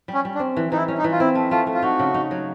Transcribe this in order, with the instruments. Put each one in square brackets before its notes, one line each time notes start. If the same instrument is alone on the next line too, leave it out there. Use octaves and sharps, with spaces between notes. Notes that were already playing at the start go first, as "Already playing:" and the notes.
[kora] G3
[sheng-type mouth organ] C#4
[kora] G3
[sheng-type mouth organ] D4
[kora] C4
E3
[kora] E3 [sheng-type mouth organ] D#4
[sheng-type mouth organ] E4
[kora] C#4
[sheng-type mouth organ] D#4
[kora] E3
[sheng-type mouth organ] F4
[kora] C4 [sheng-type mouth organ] E4
[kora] A3
[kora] A3 [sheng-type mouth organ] F4
[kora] A3
[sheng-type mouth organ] F4
[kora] D#4 [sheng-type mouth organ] F#4
[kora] C#3
D#4
F#3